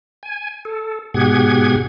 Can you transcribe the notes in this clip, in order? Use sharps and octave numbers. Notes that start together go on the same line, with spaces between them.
G#5
A4
G#2 B2 G4 G#4 F#5 G#6